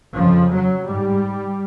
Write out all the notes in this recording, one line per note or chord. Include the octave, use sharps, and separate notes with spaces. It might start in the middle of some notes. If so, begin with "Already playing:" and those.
F2 C#3 F3
F#3
G#2 G3